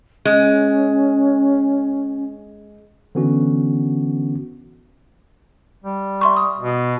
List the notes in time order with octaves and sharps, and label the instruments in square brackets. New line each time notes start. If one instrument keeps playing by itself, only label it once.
[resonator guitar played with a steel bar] G#3 [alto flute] C#4
[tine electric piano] D3 E3 B3 C#4 F#4
[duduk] G3
[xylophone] E5 C6 C#6
D#6
[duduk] B2